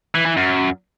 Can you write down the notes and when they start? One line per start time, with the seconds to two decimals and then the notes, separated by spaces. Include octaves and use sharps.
0.15 E3
0.26 E3
0.37 F#2